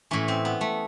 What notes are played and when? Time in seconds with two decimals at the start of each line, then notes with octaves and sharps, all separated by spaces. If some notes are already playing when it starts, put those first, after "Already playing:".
0.11 A2 E3 C#4
0.28 C4
0.45 B3
0.61 A3